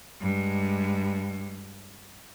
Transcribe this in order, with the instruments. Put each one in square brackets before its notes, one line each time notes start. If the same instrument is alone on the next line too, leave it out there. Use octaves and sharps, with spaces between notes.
[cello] G2 G#3